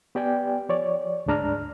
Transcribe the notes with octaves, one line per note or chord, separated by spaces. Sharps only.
B3 G4 D5 G5 G#5
F3 C#5 D5
D2 G#2 G#3 D4 A#5 F6